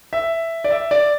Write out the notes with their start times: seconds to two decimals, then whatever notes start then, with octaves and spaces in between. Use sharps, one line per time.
0.13 E5
0.64 D5
0.71 E5
0.91 D5